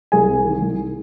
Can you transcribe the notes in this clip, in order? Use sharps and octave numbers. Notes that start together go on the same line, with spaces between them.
C2 G#4 G#5
C3
D#3
C2